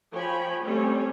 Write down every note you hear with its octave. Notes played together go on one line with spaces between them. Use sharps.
F3 C#5 G5 G#5 B5
G3 A3 C4 C#4 C#5